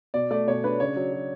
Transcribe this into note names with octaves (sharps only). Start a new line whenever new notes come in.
B2 D5
A3 D5
B2 C#5
D4 B4
C#3 C#5
F#3
F#3